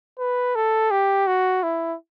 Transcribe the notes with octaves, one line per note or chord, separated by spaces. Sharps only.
B4
A4
G4
F#4
E4